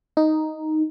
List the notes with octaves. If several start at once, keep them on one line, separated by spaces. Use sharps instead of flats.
D#4